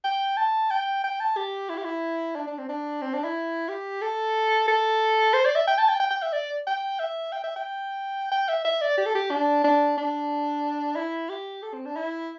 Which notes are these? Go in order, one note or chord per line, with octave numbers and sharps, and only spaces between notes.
G5
A5
G5
G5
A5
G4
E4
G4
E4
D4
D4
C4
D4
C4
D4
E4
G4
A4
A4
C5
D5
E5
G5
A5
G5
G5
G5
E5
D5
G5
E5
G5
E5
G5
G5
E5
E5
D5
G4
A4
G4
D4
D4
D4
E4
G4
A4
C4
D4
E4